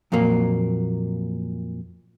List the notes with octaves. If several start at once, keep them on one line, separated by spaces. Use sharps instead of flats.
F2 A#2 F#3 A#3